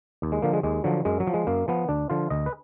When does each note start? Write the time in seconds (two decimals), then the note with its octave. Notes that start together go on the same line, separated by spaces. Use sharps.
0.22 D#2
0.32 G#3
0.42 D3 F3 A#3
0.53 G#3
0.63 D#2 G#3
0.84 D3 F3 F#3
1.05 F#2 G#3
1.20 F#3
1.27 F3
1.34 G#3
1.47 F#2 A#3
1.68 F3 B3
1.89 D2 D4
2.10 D3 F3 F4
2.30 D2 D#5
2.46 B4